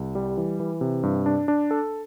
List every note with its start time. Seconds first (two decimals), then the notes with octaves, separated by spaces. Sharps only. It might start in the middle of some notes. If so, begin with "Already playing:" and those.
Already playing: C2
0.15 G3
0.37 E3
0.60 E3
0.81 C3
1.03 G2
1.26 D4
1.48 D4
1.71 A4